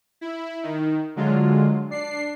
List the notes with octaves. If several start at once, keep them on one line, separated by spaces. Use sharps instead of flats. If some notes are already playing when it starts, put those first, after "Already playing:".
E4
D#3
D3 F#3 G#3 F4
D4 C7